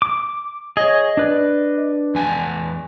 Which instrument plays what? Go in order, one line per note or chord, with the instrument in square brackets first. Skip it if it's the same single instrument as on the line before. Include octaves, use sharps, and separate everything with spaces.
[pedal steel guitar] D6
[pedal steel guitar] G#4 C#5 [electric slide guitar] D#5
[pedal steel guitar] D4 B4 D5
[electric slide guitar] E2 G#5 A5